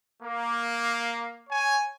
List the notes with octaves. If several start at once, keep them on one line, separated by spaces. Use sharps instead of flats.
A#3
C#5 G#5